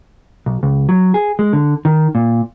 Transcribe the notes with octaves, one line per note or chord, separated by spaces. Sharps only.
B1
C#2
F#3
G#4
G#3
D3
D#3
A#2